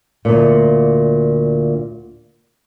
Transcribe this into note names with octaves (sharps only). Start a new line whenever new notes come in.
D2 A#2